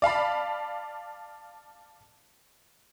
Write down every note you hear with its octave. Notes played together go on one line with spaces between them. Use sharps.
D5 F5 A5 B5